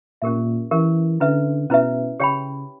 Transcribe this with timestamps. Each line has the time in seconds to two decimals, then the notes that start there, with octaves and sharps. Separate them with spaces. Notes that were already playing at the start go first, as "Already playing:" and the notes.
0.22 A#2 C#4 G4 A#4 E5
0.71 E3 C#4 G4 A#4 E5
1.20 D3 C#4 E4 B4 E5
1.69 B2 C#4 E4 B4 E5
2.20 C#3 G4 C#5 G5 B5